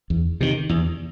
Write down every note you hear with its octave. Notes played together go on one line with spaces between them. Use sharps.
E2
C3 D#3
E2